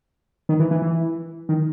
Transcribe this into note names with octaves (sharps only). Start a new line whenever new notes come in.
D#3
E3
E3
E3
D#3